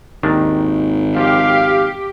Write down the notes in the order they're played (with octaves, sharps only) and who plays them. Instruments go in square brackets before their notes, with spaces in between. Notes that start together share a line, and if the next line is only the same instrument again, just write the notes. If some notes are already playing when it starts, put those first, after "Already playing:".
[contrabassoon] G#1 [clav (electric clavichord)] D#2 D#3 D4
[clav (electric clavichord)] F3 [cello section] G4 [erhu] F5